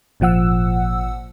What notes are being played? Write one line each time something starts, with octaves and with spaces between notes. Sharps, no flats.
G#1 A#2 F3 F#5 E6